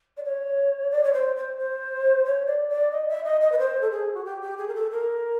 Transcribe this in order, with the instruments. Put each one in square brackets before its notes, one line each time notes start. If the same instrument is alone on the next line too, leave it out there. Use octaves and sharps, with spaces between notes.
[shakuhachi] D5
C#5
D5
C#5
C5
C5
C5
C#5
D5
D5
D#5
E5
D#5
D#5
B4
C5
A4
G#4
F#4
G4
G4
G#4
A#4
A4
A#4